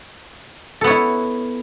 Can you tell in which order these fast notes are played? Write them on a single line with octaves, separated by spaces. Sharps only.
A4 B3 C#5 E4